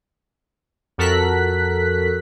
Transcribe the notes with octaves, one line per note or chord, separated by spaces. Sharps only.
F2 F#4 A4 A#4 F#6 B6